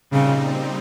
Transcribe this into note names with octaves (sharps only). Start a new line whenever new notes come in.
A#2 C#3 G3 C4 D#4